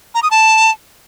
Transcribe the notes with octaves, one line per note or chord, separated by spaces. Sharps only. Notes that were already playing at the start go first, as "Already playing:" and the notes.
A#5
D#6
A5